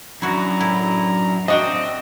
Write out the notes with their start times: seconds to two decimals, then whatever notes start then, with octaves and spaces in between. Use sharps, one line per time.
0.22 F#2 D4 E4 F#4 A#5
0.60 A2 E4
1.48 C4 D4 F#4 D#5 G5